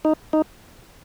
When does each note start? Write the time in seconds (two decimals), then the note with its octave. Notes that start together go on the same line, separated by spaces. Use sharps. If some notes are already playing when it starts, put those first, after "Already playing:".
0.05 D#4
0.33 D#4